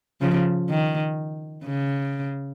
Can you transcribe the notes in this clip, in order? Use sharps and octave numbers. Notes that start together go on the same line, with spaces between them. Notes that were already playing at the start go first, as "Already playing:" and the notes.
C#3 F3
D#3
C#3